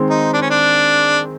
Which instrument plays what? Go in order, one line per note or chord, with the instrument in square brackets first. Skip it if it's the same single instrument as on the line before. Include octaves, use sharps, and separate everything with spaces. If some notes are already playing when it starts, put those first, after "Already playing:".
Already playing: [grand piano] D#3 G#3 C4
[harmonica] D#4
D4
C#4
D4